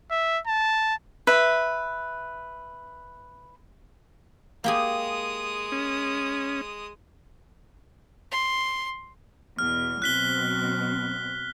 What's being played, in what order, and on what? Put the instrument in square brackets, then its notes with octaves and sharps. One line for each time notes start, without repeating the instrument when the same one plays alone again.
[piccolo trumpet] E5
A5
[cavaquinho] B4 E5
[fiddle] G#3 D#6 [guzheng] A#3 G4 G#4
[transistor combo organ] C#4
[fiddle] C6
[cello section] E2 B2 [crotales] F6
[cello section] B2 F#3 C4 [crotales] F#6 B6 G7